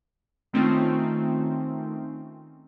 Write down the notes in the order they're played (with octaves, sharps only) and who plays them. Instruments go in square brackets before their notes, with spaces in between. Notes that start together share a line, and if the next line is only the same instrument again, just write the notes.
[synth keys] D#3 A3 C4 C#4 D#4 F4